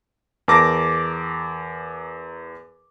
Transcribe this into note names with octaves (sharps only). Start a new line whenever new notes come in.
E2 A#4 A5 D6 A#6